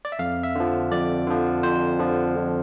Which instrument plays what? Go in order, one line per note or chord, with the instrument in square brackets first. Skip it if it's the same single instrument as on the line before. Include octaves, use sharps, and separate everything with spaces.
[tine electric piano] D5
E5
F2 F5
E5
D3 F3
F2 D5
D3 F3
F2 C5
D3 F3
F2